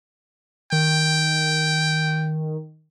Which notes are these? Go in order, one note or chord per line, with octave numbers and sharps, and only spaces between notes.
D#3 G5